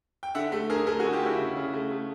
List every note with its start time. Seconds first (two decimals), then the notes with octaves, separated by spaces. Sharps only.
0.23 G5
0.35 D3 E5 F#5
0.52 A3
0.70 D3 G#4 A#4
0.87 A3 G#4 A#4
1.00 F#4 G#4
1.04 D3
1.13 F4 G4
1.22 D3 E4 F#4
1.39 C#3
1.56 C#3
1.73 A3
1.91 A3